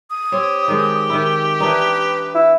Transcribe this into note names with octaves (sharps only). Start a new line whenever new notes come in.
D#6
C4 G4 C#5
D#3 G#3
D#3 E4
E3 D4 D#4 B4
E4